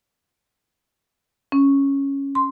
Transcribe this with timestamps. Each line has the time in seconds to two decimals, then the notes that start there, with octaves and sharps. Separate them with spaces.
1.52 C#4
2.35 C6